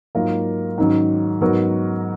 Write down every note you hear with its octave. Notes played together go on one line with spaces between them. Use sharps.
G#2 F#3 A#3 F4 A#4
G#2 D#3 F#3 C#4
G#2 F#3 B3 F#4 A#4